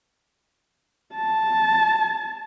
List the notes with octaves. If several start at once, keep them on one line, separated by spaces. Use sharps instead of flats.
A5